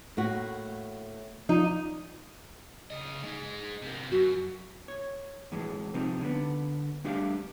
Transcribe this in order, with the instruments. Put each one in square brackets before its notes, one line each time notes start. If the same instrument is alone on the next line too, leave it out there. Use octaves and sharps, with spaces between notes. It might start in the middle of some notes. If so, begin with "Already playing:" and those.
[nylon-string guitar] A2 A#3 F#4
[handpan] F3 F4 D5 [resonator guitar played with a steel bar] D#4
[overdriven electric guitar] C#3 D#5
G#3 D#4
C3 A#3
[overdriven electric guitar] F#2 [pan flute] F#4
[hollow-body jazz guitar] C#5
A2 E3 G#3
A2 C3 F3 C4 D#4
D3 B3
G3 A3 D4 G4 D5 F5